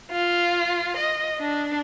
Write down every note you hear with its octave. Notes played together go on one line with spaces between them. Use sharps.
F4
D#5
D4